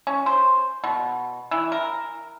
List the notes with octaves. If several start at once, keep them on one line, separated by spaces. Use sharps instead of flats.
C#4
C5
B2
E3
A#4